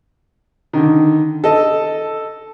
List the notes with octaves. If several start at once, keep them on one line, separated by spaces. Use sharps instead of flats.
D3 D#3
A4 D#5